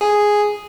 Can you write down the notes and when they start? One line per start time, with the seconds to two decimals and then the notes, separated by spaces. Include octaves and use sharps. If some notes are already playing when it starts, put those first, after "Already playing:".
0.01 G#4